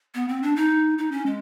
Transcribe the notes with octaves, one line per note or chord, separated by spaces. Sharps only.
B3
C4
D4
D#4
D#4
C#4
G#3